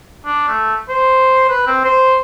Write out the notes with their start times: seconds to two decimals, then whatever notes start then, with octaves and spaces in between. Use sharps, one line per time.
0.25 D4
0.48 A3
0.89 C5
1.50 B4
1.67 C4
1.84 C5